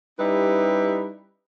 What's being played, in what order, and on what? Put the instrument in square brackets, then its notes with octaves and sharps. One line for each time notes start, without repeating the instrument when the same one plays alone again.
[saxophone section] G3 C#4 D#4 E4 G4 B4